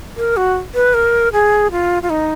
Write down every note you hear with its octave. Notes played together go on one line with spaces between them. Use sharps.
A#4
F#4
B4
A#4
G#4
F4
F4
D#4